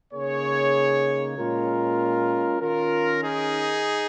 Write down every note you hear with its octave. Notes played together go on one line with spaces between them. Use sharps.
C#3 A#3 D#4 G#4 C#5
A#2 G#3 C#4 F4 A#4
D#3 C#4 F4 A#4
D#4 G#4